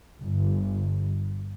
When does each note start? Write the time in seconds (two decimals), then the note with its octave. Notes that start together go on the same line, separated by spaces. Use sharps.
0.22 G1